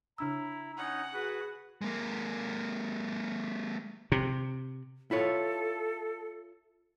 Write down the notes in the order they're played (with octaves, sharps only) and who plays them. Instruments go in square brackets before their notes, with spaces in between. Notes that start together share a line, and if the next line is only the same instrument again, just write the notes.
[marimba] C#3 D4 E6 [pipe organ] E4 [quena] A#5
[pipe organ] C#4 D#4 [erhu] F#5
[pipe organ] F#4 B4 [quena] G#4
[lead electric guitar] G#3 A#3
[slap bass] C3
[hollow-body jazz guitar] E4 F4 C#5 [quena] A4